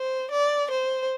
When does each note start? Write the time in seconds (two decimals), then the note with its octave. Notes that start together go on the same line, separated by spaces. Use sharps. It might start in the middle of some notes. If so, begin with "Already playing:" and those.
Already playing: C5
0.32 D5
0.71 C5